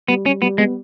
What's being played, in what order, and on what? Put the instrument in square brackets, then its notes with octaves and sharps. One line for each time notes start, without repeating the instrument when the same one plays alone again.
[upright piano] G3 [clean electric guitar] B3
[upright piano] G3 [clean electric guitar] C#4
[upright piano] G3 [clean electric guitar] B3
[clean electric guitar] G#3 [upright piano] B3